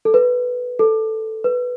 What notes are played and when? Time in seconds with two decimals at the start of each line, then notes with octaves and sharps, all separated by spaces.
0.05 A4
0.14 B4
0.79 A4
1.44 B4